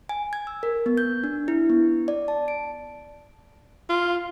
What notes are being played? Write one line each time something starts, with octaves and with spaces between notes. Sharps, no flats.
G#5
G#6
E6
A#4
B3
G6
D4
E4
B3
D5
A5
D7
F4